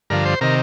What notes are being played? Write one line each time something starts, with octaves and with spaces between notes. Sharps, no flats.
G2 D3 F3 A#4
C5
C3 D#3 A#4